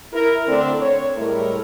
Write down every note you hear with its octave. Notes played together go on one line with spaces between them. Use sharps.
E4 A#4
D3 A3 C4 D4 A4 D5
C#5
A2 G3 G#3 E4 A4 A#4